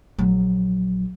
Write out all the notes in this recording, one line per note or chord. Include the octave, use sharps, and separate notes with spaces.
A#1 F#3